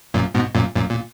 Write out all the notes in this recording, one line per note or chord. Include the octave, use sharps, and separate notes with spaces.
F#2 A#2
G#2 B2
F#2 A#2
F#2 A#2
A#2